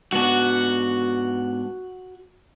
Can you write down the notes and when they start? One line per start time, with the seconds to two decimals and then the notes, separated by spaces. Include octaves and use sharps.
0.13 G#2 B3 D4 F#4